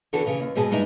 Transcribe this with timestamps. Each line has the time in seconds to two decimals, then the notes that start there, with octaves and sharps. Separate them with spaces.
0.13 E2 D3 E3 F#4 A4
0.26 C#3 E3
0.40 D#2
0.55 D#2 G#2 B2 G#4 A5
0.71 G2 G3 G#3 D#4 E4 G#5